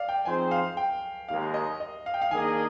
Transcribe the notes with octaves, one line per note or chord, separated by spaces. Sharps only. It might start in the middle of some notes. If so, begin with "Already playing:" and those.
Already playing: D5 F5
G5
F3 C4 D#4 G#4 C5 G#5
F5
G5
D#2 D#3 G#3 F5
D#5
D#5
F5
G5
F5
D#3 A#3 D4 G#4 D#5 G#5